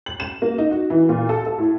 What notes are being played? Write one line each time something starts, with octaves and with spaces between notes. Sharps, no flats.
F#7
E7
A#3
D#4
F#4
E3
A#2
A4
A4
A2